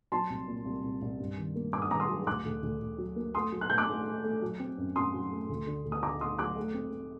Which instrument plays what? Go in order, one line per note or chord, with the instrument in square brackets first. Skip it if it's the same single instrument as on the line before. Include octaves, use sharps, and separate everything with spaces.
[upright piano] F#3 A5 C6
C2
A#2
C2
C2
C2
G2
D#3
A#3
G2 D6
D#6
D#3 A#5 D6
C6 D#6
F#3
D2 D6 F#6
D2
D2
D2
F#3
A#3
A3 C6 D#6
F#3
F#6
A3 G6
D6 F#6
A3
A3
A3
F#3
C4
F#2
F#2 C6 D#6
F#3
A3
D2
D3
D2
D#6
D2 A#5 D6
D3 C6 D#6
F#3 D6 F#6
A3
C4
C4